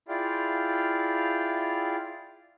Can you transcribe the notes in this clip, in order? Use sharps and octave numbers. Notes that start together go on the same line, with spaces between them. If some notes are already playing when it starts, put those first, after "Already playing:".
E4 F4 G#4 D5 F5 G5